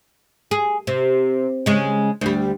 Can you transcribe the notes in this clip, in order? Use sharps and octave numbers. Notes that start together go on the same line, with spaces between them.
G#4
C3
C#3 G#3
D2 G3